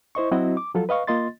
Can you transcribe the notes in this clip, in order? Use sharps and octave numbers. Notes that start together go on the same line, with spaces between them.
E4 C5 D#5 C#6
F#3 C4 E4 F#4 D#5
D6
F3 F#3 F4 A4
B4 D#5 F5 C#6
A#3 F4 D#5 C6 A6